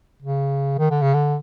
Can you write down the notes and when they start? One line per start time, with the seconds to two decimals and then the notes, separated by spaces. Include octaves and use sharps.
0.22 C#3
0.79 D#3
0.91 D3
1.02 C#3
1.14 D3